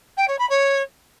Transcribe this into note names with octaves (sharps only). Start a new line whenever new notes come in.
G5
C#5
B5
C#5